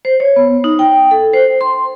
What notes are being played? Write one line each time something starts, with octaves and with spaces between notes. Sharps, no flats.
C5
C#5
B3
D#4
G5
A4
C5
C6